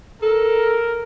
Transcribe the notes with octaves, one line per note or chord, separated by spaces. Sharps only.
A4 A#4